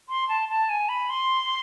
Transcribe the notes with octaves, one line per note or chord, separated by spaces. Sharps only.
C6
A5
A5
G#5
B5
C6